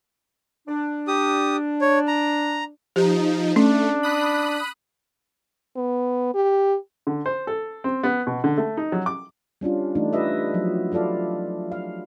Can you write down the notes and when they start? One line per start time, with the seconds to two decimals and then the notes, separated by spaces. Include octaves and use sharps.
0.68 D4
1.08 G4 D#6
1.81 C#5
2.08 A#5
2.96 F3 D#4 G4
3.56 A3 C#4 D4
4.03 B5 D#6 F#6
5.77 B3
6.34 G4
7.07 D3
7.26 C5
7.47 A4
7.84 C4
8.04 B3
8.27 B2
8.44 D3
8.58 A3
8.77 D#4
8.92 F#3
9.06 D6
9.61 G3 C#4 D4 F4
9.95 E3 A3 D4 D#4
10.13 F4 G4 B4 D#5 E5
10.54 F3 F#3
10.92 E4 F4 A4 D5 F5
11.72 F5